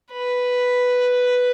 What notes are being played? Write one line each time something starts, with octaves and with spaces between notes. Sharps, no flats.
B4